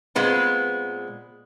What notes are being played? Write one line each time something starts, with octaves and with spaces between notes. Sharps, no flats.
A#2 G#3 B3 C4